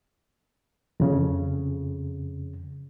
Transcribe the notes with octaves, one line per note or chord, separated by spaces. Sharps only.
F2 C#3